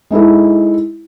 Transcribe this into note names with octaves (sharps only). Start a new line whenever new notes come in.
G#3 D#4 E4 A4